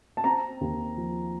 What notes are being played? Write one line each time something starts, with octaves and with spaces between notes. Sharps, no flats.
A5
C4 A#5
D#2
F3